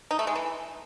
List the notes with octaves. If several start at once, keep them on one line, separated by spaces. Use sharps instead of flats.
D#4
A3
G#3
E3